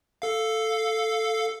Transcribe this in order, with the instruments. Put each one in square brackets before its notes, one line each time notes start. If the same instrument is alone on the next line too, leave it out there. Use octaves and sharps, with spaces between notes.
[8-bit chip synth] A4 F5